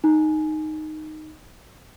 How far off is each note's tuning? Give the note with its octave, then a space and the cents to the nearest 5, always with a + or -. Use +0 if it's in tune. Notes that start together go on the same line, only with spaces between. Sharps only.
D#4 -5 G#5 +20